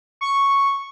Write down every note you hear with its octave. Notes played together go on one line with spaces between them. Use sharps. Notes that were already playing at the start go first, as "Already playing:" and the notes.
C#6